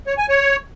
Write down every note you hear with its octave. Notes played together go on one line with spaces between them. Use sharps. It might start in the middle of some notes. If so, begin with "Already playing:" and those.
C#5
G#5
C#5